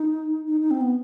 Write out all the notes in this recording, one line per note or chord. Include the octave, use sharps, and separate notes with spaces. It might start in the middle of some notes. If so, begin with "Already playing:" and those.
Already playing: D#4
D#4
D#4
C4
B3